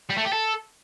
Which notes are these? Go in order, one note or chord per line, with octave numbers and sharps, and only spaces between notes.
G3
A3
G4
A4